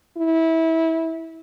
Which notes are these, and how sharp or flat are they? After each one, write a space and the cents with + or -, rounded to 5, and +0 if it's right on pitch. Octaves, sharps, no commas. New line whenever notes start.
E4 -20